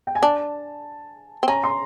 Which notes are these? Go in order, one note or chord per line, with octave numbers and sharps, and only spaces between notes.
G5
G#5
D4 A5
C4
C#4 A#5
C6